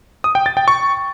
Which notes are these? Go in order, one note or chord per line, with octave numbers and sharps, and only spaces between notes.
D#6
G5
A6
G5
C#6